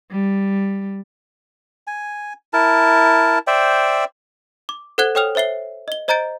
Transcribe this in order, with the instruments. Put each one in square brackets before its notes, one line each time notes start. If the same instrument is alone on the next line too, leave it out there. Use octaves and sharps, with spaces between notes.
[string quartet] G3
[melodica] G#5
E4 A#4 A5
C5 D5 E5 G5
[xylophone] D6
A4 C5 F#5 F#6 G#6 G7
A4 C#5 G5 D#6 F6 F7
C5 C#5 E5 C7 G7
D#5 G7
C5 D#5 A#5 G6 A6 D7